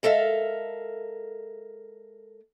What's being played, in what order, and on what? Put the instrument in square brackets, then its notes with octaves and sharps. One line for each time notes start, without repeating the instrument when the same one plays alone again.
[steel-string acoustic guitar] G#3 A4 A#4 E5 F5